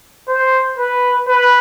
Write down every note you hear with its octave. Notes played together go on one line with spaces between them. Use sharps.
C5
B4
B4